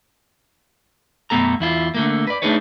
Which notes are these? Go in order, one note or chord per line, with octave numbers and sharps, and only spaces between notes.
F#2 B2 A3 B3 A4 A#5
E2 E4 F4
D3 A3 A#3
B4 D5
A3 D4 D#4 G#4 B4 C#5